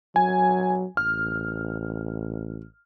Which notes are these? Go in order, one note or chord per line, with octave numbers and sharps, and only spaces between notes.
F#3 G#5
A1 F6